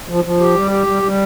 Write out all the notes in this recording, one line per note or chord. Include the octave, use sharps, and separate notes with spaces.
F3
F3
G4
G3
G4
G3
G3